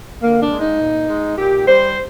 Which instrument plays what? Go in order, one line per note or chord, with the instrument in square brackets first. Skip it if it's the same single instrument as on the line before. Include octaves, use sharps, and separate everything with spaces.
[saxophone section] D3 A#3
D4
G#3
D#4
A#2
G#3
A#2 G4
G3 C5